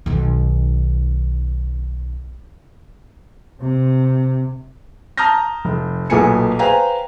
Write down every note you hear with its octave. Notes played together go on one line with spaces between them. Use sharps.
B1 D#3
C3
A5 A#5 D#6 F6 G6 A#6
F1
B1 A#2 A3 B3 G#5 C#7
B4 C5 F5 G5 G#5 A#5